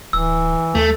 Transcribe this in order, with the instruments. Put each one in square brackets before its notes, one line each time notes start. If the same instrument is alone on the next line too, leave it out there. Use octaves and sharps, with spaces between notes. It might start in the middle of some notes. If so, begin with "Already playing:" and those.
[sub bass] D1 [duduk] E3 [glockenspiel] E6
[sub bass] D#2 [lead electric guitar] A3